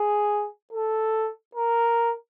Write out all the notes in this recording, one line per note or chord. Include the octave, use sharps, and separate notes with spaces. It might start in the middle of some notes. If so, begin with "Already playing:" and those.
Already playing: G#4
A4
A#4